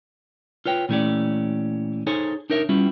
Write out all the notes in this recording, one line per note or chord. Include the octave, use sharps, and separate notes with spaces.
F4 B4 C#5 G5
A#2 E3 A3 C#4 G4 D5
D#4 G#4 A4 C5 C#5 G#5
D4 D#4 A#4 C#5 E5
G3 B3 C#4 E4 F4 G4